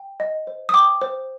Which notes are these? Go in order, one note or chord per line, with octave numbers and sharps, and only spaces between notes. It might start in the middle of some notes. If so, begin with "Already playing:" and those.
Already playing: G5
D#5
C5
D#6
G5 D6
C5